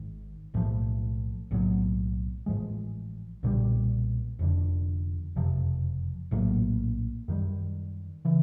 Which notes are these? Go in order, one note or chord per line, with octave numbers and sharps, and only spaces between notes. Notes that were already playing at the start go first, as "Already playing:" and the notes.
Already playing: G#1 G#2 D#3
B1 A2 F3
B1 A2 F#3 B3
A1 G#2 F3 G#3
B1 A#2 G3
F1 F2 D3
F#1 F2 C3 F3
A#1 A2 F#3 A#3
F#2 D#3 G3
C#3 E3